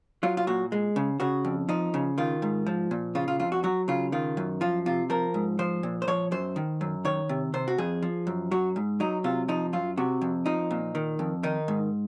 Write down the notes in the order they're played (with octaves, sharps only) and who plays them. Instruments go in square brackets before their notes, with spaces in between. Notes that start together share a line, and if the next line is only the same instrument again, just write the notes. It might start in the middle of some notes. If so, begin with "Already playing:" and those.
[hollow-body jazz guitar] F#3 F4
F4
A#2 F#4
G#3
C#3
C#3 F#4
F2
F3 D#4
C#3
D#3 F4
G#2
F3
A#2
C#3 F4
F4
F2 F4
F#4
F#3 F#4
C#3 F4
D#3 F4
F#2
F3 F4
C3 F4
F3 A#4
G#2
F3 C5
A#2
C5
F3 C#5
F#2 C5
D#3
F#2
D#3 C#5
C3
C3 C5
F#4
F2 G#4
F3
F#2
F#3 F#4
G#2
F#3 D#4
C3 F4
F3 D#4
F#2 F4
C3 F#4
F2
F3 D#4
A#2
D#3
F2
D#3 D#4
G#2